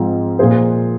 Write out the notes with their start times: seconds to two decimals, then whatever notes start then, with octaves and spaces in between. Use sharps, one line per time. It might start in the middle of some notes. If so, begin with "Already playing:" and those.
Already playing: G#2 F3 C4 G#4
0.39 A#2 F3 A#3 G#4 C5